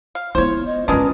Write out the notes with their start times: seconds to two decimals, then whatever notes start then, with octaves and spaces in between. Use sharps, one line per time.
0.15 F5
0.35 B3 E4 F4 C5 C#5
0.66 D#5
0.88 C#4 D4 F4 G#4 A#4 B4